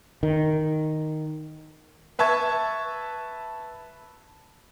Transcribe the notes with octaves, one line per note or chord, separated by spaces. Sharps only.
D#3
B4 E5 A5 C#6 G#6